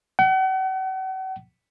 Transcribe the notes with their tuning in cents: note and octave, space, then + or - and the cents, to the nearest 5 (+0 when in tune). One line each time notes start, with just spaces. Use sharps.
F#5 +40